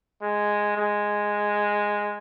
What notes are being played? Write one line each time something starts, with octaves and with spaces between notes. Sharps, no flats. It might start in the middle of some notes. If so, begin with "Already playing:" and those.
G#3
G#3